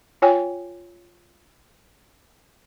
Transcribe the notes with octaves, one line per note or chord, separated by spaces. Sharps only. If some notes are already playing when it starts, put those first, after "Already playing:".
F4 C#5 G5 G#5